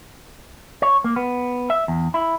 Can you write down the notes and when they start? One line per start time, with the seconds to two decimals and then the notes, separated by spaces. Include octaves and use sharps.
0.82 C#5
1.04 A#3
1.16 B3
1.70 E5
1.88 E2
2.14 E4